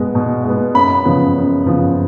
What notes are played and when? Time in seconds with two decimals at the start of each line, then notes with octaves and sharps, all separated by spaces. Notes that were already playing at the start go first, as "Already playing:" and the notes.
Already playing: B2 G#3 B3
0.15 B2
0.44 G#3 B3
0.75 F#2 B5
1.05 C#3 F3 B3
1.36 F#2
1.66 C#3 F3 B3